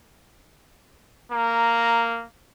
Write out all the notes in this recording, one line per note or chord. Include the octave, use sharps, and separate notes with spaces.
A#3 A#5